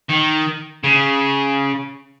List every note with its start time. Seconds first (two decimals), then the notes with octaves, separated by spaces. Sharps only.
0.09 D#3
0.84 C#3